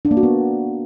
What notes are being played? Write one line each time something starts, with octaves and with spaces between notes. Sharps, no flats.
D4
A#3
F#4
B3